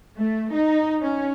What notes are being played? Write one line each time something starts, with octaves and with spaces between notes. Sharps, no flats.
A3
D#4
C#4